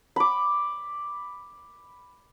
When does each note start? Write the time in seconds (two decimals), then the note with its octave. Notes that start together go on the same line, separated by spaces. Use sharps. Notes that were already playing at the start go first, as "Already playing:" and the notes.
0.16 B5 D6